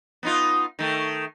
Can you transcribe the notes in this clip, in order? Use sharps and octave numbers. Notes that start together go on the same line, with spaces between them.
B3 D#4 F4
D#3 A3